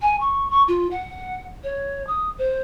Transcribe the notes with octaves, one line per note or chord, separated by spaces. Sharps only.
G#5
C#6
C#6
F4
F#5
C#5
D#6
C5